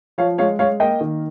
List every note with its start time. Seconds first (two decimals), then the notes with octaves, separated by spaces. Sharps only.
0.18 F3 C#5 F5
0.38 G#3 C#5 F5
0.59 G#3 C#5 F5
0.80 A#3 D#5 G5
1.01 D#3